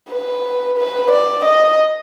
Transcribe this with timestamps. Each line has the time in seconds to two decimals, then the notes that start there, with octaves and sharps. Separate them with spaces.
0.10 B4
0.77 B4
1.11 D5
1.45 D#5